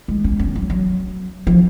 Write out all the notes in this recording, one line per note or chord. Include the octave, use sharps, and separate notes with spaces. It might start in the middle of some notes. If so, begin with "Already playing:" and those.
G#3
C#4
C#4
F#3
F#3
F3